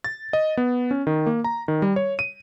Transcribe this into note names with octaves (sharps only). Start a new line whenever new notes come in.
A6
D#5
B3
C#4
D#3
A#3
A#5
D#3
G3
C#5
D#7